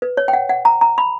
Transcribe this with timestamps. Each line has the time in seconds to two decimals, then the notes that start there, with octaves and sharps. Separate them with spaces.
0.02 B4
0.17 C#5
0.28 G5
0.33 F#5
0.49 F#5
0.65 A#5
0.81 A#5
0.98 B5